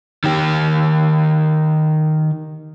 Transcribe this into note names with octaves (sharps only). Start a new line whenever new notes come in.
D#3 G4